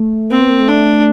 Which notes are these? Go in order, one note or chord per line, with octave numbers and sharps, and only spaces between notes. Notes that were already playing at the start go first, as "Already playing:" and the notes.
Already playing: A3
A#3 C4
B3
A#3
A3
D4